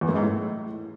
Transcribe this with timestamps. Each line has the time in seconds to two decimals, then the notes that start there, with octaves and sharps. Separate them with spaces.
0.01 E2
0.08 F#2
0.15 G#2
0.22 A2